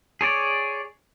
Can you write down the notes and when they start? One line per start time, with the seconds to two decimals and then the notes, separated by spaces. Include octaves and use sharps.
0.21 G#4 C#5 D5